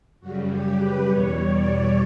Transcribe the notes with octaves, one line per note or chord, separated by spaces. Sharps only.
F#2 C#3 G3 F#4
G4
B4
E2 B2 G3 C#5
D5